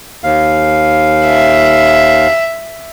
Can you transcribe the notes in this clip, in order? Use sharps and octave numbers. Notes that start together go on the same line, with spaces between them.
D#2 F5
E5